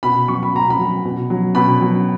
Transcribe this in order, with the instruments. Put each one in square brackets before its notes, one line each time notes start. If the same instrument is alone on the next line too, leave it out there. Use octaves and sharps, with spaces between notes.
[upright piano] B2 B5
F#3 C#6
B5
B2 A#5
B5
F#3
B2
F#3
B2 B5
F#3